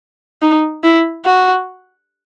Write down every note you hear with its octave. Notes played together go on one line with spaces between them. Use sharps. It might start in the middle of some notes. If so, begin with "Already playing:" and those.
D#4
E4
F#4